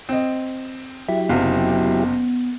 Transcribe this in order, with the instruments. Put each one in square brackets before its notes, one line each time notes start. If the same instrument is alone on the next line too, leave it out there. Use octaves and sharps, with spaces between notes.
[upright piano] C4 D#5
[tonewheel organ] F#3 E4 G4 [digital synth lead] E5
[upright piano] F#1 C3 F5 [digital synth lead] B3